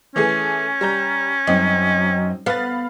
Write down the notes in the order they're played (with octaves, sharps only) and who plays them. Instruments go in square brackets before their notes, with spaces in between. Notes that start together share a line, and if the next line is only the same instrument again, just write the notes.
[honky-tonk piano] E3 A3 G#4 [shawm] C#4
[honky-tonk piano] G3 A#5 G6
[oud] F#2 [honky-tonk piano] C4 D#4
[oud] B3 [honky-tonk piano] F5 B5 A6